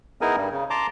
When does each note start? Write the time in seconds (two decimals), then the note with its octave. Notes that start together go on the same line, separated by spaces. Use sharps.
0.21 B3 D#4 E4 G#4 A#4 G#5
0.37 G2 G3
0.52 C#3
0.70 A5 A#5 C6 D6